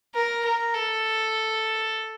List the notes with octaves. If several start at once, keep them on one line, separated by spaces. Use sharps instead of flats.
A#4
A#4
A4